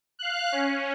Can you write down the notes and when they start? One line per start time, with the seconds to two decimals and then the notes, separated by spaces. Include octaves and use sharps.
0.19 F5 F#6
0.52 C#4